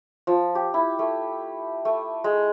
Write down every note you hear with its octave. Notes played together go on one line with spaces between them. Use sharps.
F3
G4
E4
A3
A3
G#3